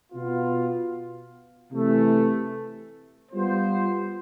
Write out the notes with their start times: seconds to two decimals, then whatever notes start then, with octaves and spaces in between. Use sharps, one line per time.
0.13 B2 B3 F4
1.72 C3 E3 A3
3.32 G3 B3 F4 C5